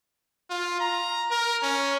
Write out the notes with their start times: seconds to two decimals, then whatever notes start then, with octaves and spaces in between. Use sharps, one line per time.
0.50 F4
0.80 A#5
1.31 A#4
1.63 C#4